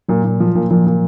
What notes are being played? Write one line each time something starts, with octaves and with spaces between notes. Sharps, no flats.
A#2 F#3
A#2
F3
A#2
A#2 F3
A#2